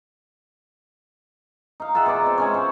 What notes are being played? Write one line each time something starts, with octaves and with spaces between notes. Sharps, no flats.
D#4 F5
F4 G#4 E5 F#5
B2 D5 A#5
C4
G#3 C#4 C#5
C5